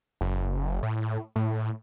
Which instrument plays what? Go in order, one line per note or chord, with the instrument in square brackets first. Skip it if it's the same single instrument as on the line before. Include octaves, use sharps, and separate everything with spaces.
[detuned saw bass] F#1
A2
A2